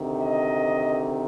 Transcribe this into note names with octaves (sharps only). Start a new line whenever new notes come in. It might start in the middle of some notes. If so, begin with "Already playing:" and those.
Already playing: D2 C3 D#3
D#5